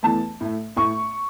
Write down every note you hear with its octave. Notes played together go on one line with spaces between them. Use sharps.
E2 E3 A3 A5
A2 A3
A2 A3 C#6